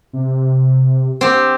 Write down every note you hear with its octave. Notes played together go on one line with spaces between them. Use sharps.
C3
C4 G4